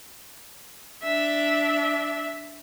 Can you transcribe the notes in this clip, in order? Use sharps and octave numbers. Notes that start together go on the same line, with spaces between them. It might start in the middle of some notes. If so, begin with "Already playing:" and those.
D4 E5